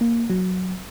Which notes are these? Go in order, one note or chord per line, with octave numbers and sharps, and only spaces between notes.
A#3
F#3